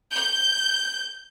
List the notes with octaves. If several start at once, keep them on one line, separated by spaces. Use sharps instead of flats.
G6